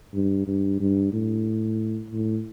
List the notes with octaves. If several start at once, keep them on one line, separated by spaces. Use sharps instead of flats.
G2
G2
G2
A2
A2